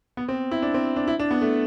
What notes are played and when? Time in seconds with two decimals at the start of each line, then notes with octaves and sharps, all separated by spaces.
0.17 B3
0.29 C4
0.51 E4
0.62 D4
0.74 C4
0.96 D4
1.08 E4
1.19 D4
1.31 B3
1.41 A3